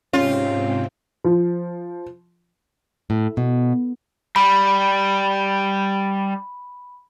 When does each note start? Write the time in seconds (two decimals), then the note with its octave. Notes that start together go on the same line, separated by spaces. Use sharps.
0.13 G#2 C3 C4 C#4 F4
1.24 F3
3.10 A2
3.37 B2
4.36 G3 B5